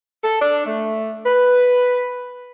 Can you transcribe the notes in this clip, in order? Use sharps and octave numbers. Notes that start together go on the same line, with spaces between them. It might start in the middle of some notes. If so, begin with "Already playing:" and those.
A4
D4
A3
B4